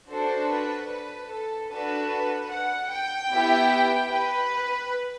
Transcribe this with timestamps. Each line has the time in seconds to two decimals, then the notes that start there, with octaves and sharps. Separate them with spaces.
0.11 D4 F#4 A4 C5
0.51 B4
0.92 B4
1.31 A4
1.71 D4 F#4 A4 B4
2.51 F#5
2.91 G5
3.32 B3 E4 G4
4.11 B4